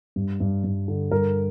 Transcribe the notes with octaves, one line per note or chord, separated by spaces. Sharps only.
G2
G2
G2
D3
G2 A#4